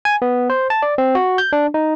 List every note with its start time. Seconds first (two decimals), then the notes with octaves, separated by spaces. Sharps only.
0.05 G#5
0.22 B3
0.50 C5
0.70 A5
0.82 D5
0.98 C4
1.15 F#4
1.38 G6
1.53 D4
1.74 D#4